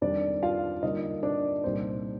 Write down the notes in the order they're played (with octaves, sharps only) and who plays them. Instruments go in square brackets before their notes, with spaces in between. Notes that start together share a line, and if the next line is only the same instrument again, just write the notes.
[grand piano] F2 D#3 G3 D4 D5
F4 F5
D3 G3 A#3 D4 D#4 F4 D#5
D4 D5
C2 A#2 G3 C4 D#4 C5